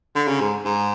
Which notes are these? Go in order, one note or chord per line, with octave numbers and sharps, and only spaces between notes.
D3
C#3
G#2
G#2